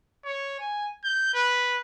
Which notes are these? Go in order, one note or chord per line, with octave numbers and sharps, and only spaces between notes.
C#5
G#5
G6
B4